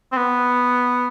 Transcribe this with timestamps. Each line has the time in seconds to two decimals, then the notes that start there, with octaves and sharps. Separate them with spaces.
0.12 C4
0.17 B3